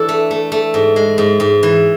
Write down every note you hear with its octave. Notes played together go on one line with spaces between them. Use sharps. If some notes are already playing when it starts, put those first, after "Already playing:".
Already playing: E3 D4 A4
A3
A3
A3
G#2
G#3
G#2
G#2
E3